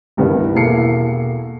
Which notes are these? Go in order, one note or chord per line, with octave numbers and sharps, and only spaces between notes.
C2 G2 D#3 B3 E4 A#4
E1 A#3 E4 A4 C7 C#7